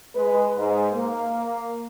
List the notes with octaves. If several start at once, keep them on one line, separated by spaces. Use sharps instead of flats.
G#3 B4
G#2
A#3